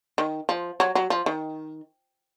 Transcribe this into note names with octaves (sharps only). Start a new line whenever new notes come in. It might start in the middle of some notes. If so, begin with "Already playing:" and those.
D#3
F3
F#3
F#3
F3
D#3